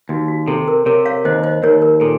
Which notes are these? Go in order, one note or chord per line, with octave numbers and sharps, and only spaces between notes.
D#2 F#4
F#4
C3 A4
A#4
C3 A#4 C#5
C#5 F5
D#2 C5 D#5
C5 D#5
D#2 A#4 C#5
A#4
A#2 A4